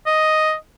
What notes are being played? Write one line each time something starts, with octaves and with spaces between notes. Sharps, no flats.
D#5